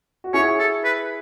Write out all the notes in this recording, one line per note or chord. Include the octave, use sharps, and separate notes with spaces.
F#4
E4 G#4 C#5
A4
B4